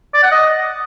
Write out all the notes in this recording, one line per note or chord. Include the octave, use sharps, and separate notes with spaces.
D5
F#5
D#5